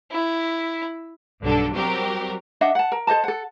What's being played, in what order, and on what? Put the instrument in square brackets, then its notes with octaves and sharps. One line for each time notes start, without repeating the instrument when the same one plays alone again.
[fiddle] E4
[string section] B1 G2 D3 F#3 D4 A4
F#3 G3 C4 F#4 G4 A#4
[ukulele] D4 D#5 E5 F#5
F#5 A5
A#4
A4 C5 D#5 A5
A4 F#5